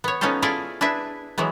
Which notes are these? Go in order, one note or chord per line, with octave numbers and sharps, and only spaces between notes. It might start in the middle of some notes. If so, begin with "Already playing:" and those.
B3 C#5
B3 C#4 D#4 F4 A4 C5
E4 F4 G#4 A4 D5 E5
D4 E4 G#4 B4 E5
E3 F#3 G#3 B3